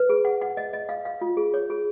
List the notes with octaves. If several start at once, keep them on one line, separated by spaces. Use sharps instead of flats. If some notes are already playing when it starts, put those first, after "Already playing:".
Already playing: B4
G#4
F#5
F#5
D#5
D#5
F5
F5
F4
G#4
C#5
G#4